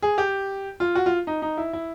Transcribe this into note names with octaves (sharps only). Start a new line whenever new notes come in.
G#4
G4
F4
F#4
F4
D#4
D#4
E4
E4